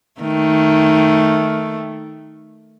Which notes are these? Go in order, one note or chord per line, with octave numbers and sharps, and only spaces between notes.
D#3 A3